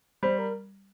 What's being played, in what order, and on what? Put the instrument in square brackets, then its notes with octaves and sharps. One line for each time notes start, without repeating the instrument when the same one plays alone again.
[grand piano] G3 [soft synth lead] C5
[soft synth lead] A#4